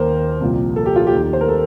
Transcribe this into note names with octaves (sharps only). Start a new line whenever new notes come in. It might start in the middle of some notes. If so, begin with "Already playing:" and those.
Already playing: D#2 D#3 A#4 C5
C2 A#2 F3
A4
G4
F4
G4
D#2 D#3
C5
A#4
A4